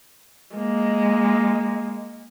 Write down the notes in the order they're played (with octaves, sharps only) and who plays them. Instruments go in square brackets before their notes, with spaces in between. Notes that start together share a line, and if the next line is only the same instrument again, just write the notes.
[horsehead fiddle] G#3 A#3